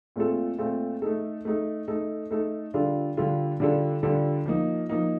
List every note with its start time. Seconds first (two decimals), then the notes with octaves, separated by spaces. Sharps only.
0.16 A#2 A3 C4 F4 A4
0.58 A#2 A3 C4 F4 A4
1.02 A3 D#4 A4
1.45 A3 D#4 A4
1.88 A3 D#4 A4
2.31 A3 D#4 A4
2.74 D3 G3 D4 F4 A4
3.17 D3 G3 D4 F4 A4
3.60 D3 G3 D4 F4 A4
4.03 D3 G3 D4 F4 A4
4.46 F3 A#3 D#4
4.89 F3 A#3 D#4